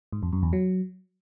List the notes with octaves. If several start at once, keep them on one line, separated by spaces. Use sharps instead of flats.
G#2
F2
F#2
E2
F#3